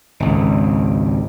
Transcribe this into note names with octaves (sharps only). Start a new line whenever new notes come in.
G#1 C#2